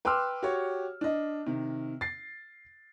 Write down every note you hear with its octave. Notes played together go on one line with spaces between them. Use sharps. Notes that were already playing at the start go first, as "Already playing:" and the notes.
B4 G5 C6 D6 E6 F6
F#4 G4 C#5
D4 D#5
C3 D#3
A6 C7